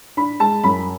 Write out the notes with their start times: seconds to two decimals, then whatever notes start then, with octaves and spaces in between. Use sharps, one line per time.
0.17 D4 B5
0.40 G#3 A5
0.64 F#2 B5